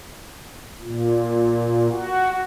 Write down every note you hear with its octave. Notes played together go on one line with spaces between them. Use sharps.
A#2
F#4